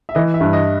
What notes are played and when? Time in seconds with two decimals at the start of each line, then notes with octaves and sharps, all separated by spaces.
0.09 E5
0.15 E3 D#5
0.34 E5
0.41 G2
0.53 D#5